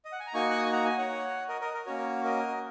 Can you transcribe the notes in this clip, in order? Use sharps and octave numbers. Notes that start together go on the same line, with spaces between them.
D#5
F#5
G#5
A#5
A#3 D#4 F#4 G#5 C#6
F#6
D#6
C#6
F#5 A#5
D#5 G#5
C#5 F#5
A#4 D#5
A#4 D#5
A#4
A#3 C#4 F#4 C#5
A#4 D#5